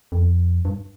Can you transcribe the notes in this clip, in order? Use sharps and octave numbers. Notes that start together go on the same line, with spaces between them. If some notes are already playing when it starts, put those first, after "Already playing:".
F2
G2